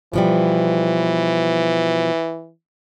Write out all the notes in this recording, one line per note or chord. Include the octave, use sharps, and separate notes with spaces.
B2 E3 F3 G3